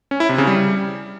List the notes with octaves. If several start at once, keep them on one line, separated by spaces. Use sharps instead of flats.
C#4
E4
C3
C#3
G3